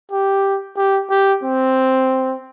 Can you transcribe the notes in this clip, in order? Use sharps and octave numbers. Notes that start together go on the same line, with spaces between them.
G4
G4
G4
C4